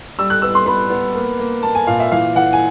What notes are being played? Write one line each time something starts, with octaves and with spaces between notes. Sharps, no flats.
G3 E6
F#6
B3 E6
C6
B3 B5
B3
A#3
A#3
A#3 A5
G#5
A#2 F5
E5
E3 F5
E3 F#5
G#5